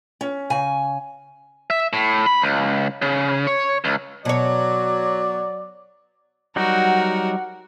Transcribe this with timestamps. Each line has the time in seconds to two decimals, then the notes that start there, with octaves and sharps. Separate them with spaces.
0.21 C#4
0.50 C#3 G#5
1.70 E5
1.93 A2
2.27 B5
2.42 C#2
3.02 C#3
3.47 C#5
3.85 C#2
4.25 B2 F#3 C#5 D5
6.56 F#3 G3 D#4 F#4 A#4 F#5